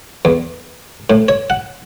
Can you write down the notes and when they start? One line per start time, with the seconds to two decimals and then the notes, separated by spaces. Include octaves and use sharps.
0.25 E2
1.10 A2
1.28 C#5
1.50 F#5